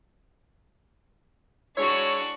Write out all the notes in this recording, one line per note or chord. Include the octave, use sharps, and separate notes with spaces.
G#3 D4 E4 F#4 C#5